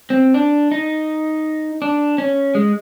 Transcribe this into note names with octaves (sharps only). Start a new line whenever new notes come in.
C4
D4
D#4
D4
C#4
G#3